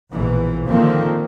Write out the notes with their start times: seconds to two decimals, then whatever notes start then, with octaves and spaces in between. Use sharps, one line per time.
0.11 A#1 B2 E3
0.66 D3 D#3 F3 A#3 C4